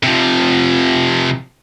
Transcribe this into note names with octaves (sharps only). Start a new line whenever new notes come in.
C3 F3